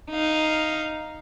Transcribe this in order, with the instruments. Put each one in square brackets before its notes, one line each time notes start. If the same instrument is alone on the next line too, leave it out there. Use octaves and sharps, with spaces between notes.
[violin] D#4 F5